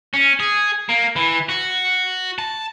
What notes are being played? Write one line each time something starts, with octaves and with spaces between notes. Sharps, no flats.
C#4
G#4
A#3
E3
F#4
A5